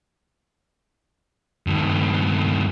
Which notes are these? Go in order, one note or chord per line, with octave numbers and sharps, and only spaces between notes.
G2 D#3